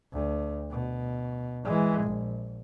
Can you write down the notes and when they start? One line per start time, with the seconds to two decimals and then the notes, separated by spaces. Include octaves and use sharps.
0.13 D2
0.71 B2
1.65 E3 G#3
2.03 A#1